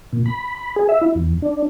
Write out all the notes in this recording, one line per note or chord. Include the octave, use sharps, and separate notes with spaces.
A#2
B5
B5
G#4
E5
E4
E2
D4